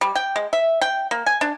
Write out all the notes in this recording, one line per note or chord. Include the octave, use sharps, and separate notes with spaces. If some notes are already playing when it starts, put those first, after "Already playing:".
G3
G5
G#3
E5
G5
A#3
G#5
D4